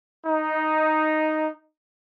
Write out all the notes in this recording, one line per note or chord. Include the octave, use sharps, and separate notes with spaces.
D#4